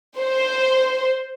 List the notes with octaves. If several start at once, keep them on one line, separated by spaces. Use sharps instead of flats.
C5